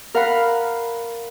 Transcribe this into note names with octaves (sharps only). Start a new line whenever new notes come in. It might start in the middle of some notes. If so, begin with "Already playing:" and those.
A#4 F5 F#5 B5